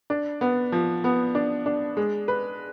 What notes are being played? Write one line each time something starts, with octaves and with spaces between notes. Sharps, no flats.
D4
B3
F3
B3
D4
D4
G#3
B4